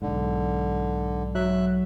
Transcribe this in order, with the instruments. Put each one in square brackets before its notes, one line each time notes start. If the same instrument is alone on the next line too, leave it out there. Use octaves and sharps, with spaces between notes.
[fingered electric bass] B1 G#2 [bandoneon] D3
[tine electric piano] F#3 [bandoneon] E5 F#6